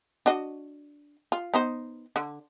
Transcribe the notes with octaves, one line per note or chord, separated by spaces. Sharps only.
D4 F#4 D#5
F4
B3 D#4 C5
D3